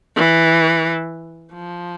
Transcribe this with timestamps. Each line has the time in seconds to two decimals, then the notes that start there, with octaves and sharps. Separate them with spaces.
0.16 E3
1.53 F3